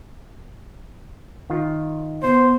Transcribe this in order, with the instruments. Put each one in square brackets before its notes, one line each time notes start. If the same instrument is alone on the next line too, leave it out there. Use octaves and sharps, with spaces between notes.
[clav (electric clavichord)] D#3 F4
[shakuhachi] B3 [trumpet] C5